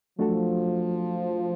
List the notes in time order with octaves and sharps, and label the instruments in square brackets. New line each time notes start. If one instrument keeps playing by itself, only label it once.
[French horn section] F3 [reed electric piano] F#3 A3 D4 F#4 A4